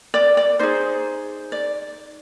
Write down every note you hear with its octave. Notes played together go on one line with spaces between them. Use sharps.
D5
D5
D#4 G#4 C5
D5